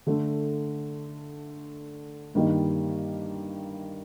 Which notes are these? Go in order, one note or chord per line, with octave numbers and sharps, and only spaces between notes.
D3 A3 D4
G2 D#3 G3 A#3 D#4